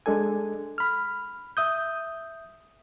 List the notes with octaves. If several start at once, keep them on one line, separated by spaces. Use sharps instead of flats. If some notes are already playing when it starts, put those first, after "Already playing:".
G#3 D4 A4 G#5
B5 F6
E5 D#6 G6